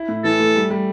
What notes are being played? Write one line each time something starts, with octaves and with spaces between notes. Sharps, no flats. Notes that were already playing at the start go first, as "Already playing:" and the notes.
Already playing: E4
A2
E3 A4
A3
G3
G3